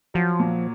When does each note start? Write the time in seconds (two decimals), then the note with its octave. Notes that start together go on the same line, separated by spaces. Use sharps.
0.14 F3 F#3
0.39 A#2